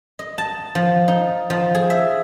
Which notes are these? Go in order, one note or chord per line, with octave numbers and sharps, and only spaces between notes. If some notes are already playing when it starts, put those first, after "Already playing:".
D#5
A5
F3
D#4
F3
G#4
E5